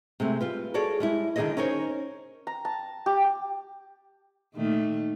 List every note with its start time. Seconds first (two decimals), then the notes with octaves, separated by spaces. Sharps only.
0.20 C3 G#3 A3
0.41 G3 F4 B4
0.74 F#4 G#4 A4 C#5 D5
1.00 G3 G#3 E4
1.36 D3 D#3 D#4 G#4 C#5 D#5
1.57 C#4 D#4 A#4 C5 C#5
2.47 A#5
2.65 A5
3.06 G4
4.55 A#2 D#3 A3